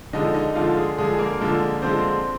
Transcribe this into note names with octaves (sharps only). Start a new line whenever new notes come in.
D3 F3 G#3 D#4 D#5
D#4 D#5
D3 F3 G#3 F4 F5
G#4
D3 F3 G#3 G#4
G#4
A#3 A#4
D3 F3 G#3
D3 F3 G#3 C4 C5